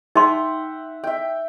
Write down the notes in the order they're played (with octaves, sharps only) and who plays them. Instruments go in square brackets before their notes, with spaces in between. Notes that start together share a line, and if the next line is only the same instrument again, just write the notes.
[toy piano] D#4 C6 [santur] E5 F#5 G5
[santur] E5 G5